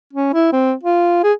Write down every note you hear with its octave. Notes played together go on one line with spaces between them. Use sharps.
C#4
E4
C4
F4
G#4